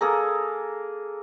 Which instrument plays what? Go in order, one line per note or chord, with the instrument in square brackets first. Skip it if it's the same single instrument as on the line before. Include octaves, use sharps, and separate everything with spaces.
[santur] A#3 G#4 A4 A#5